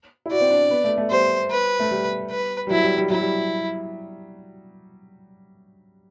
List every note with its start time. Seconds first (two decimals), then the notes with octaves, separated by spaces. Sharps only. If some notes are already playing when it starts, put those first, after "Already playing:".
0.26 E4
0.31 F#4 D5
0.41 C4
0.50 D4
0.71 B3
0.84 A3
0.98 A3
1.10 G3 C5
1.51 B4
1.80 A3
1.91 G3
2.30 B4
2.67 G3
2.70 F#3 E4
2.84 G3
2.97 G3
3.10 F#3 E4
3.21 G3